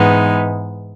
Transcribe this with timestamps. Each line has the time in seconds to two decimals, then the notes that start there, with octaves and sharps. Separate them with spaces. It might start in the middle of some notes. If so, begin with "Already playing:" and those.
Already playing: G#2 E3 G#3 B3 D#4